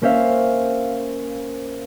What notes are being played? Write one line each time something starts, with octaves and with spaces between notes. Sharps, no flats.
A#3 C#4 C5 E5 F5